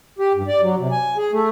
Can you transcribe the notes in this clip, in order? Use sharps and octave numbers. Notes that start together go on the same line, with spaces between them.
G4
G2
D5
F#3
C3
G#5
G#4
A3